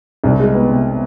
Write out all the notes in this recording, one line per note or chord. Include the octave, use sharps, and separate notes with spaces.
C2
G#3
B3
C3